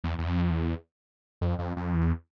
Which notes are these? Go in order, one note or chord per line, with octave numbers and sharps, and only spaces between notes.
E2
E2
F2
E2
F2
F2
F2
E2